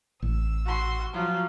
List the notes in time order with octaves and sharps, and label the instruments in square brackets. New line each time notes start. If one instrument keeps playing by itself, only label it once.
[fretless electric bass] A1 [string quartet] E6
[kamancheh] F#4 C6
[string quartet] F3 F#3 [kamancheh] F4